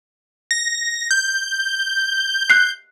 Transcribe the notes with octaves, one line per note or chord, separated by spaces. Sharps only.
A#6
G6
F#6 C7